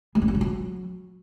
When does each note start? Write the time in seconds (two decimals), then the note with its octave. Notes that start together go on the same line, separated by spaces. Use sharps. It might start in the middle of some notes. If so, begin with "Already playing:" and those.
0.15 G#3
0.22 G2
0.28 G3
0.35 A#2
0.41 F#3